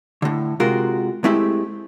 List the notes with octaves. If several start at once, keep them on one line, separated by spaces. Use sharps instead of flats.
A2 D3
C3 G#3 F4 F#4 A#4
G#3 A3 C4 E4 G4